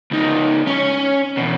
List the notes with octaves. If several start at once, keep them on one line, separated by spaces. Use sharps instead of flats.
C#2 D#4
C#4 C#5
E2 B2